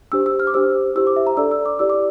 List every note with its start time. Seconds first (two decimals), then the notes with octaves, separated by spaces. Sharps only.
0.12 D4 G4 C5 E6
0.26 E6
0.40 F6
0.47 D6
0.54 D4 G4 C5 E6
0.95 E4 G4 C5 E6
1.07 D6
1.16 E5
1.27 A#5
1.37 D4 A4 D5 E6
1.51 E6
1.66 D6
1.79 E4 G4 D5 E6
1.90 D6